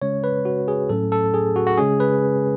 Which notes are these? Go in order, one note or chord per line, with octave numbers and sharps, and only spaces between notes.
C#3 G#3 C#4 C#5
B4
F#4
G#4
A2 F#3 A3 C#4 A4
A4
G#4
F#4
F#4
C#3 G#3 C#4 G#4
B4